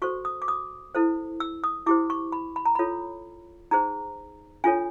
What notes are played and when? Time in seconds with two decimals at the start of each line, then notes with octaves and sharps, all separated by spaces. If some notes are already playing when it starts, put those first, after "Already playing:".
0.02 F#4 A4 C5 C#6
0.25 D#6
0.42 D6
0.48 D#6
0.95 E4 A4 C5
1.40 E6
1.64 D#6
1.86 E4 G4 C5 D6
2.10 C#6
2.32 B5
2.56 B5
2.65 A#5
2.75 F4 A4 C#5 B5
3.71 D#4 G#4 C5 A#5
4.64 D4 F4 A4 C#5 G#5